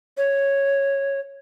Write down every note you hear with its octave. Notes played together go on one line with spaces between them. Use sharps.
C#5